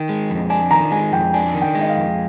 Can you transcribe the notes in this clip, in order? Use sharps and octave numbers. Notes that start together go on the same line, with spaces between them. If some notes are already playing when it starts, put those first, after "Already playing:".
Already playing: D#3 G5
G#3
F2
D4 G#5
D#3 A#5
G#3 G#5
F2 G5
D4 G#5
D#3
G5
G#3
D#5
F5
F2